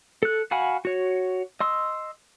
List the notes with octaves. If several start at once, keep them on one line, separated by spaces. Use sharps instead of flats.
A4 F#6
F#4 F5 F#5 G#5 B5
F#4 C#5
D#5 C6 E6